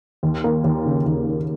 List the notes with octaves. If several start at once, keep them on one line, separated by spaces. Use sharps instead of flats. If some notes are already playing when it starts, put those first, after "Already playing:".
D#2
A#3
D#2
C#3
D#2
A#3